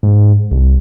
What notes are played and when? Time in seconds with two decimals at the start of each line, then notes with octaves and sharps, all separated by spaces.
0.03 G#2
0.51 C2